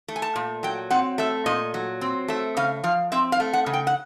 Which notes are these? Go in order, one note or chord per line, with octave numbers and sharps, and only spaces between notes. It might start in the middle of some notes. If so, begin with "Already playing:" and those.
A3
G#5
A5
A#2
F#3 G5
C4 F#5
A3 E5
A#2 D#5
F#3
C4
A3 E5
C#3 F5
F3 F5
C4 E5
F5
A3
F#5
C#3
G5
F#5